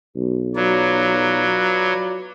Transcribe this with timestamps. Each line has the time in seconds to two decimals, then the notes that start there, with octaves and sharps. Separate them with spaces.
0.16 B1
0.56 F#3 F4 F#4 B4 C#5 D5 A#5